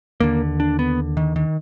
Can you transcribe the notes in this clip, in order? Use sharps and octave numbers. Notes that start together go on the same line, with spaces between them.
D#2 D3 A#3
D4
B3
D#3
D#3